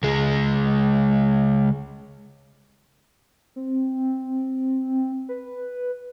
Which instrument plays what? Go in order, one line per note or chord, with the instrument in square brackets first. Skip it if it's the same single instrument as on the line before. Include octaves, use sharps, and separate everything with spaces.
[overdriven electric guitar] C#2 G#3
[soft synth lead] C4
B4